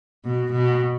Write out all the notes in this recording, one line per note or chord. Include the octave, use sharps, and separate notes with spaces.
B2
B2